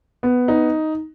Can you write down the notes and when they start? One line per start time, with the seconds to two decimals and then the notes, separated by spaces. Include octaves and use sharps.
0.23 B3
0.48 D#4